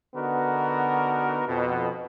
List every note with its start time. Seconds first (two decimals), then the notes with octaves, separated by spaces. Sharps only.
0.15 D3 B3 D#4 F#4 A#4
1.48 F2 B2